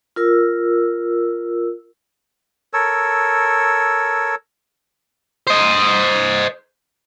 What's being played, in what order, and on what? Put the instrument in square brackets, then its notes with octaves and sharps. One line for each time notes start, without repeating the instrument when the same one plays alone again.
[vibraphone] F4 A#4 E6
[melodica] A4 A#4 C#5 E6
[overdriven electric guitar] C5 D#5